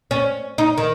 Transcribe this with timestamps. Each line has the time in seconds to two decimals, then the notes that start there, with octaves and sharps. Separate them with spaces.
0.11 C#4
0.58 D#4
0.78 D#3